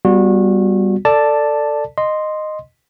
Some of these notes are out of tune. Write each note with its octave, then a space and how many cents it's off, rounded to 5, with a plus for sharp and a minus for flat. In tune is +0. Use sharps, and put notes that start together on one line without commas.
G3 +0 B3 -5 F#4 -30
A4 +20 D5 +5 A5 +0
D#5 -10 C6 +0